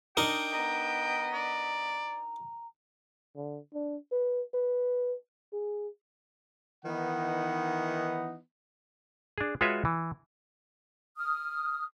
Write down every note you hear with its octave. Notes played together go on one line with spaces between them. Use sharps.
D4 D#4 A#4 G5
B3 D#5 A#5
D5
D3
D4
B4
B4
G#4
D#3 E3 B3 D#4 F#5
D4 G#4
G#3 F4 F#4 B4 C#5 E5
E3
D#6 F6